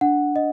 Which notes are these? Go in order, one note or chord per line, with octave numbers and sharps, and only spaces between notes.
D4 F#5
D#5